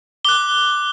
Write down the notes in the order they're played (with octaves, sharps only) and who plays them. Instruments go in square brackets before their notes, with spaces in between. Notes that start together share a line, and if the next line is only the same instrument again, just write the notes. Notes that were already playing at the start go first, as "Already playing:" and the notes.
[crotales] D6 F#6 G7